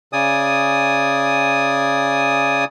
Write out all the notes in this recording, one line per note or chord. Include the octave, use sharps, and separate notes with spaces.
C#3 D5 G#5 D#6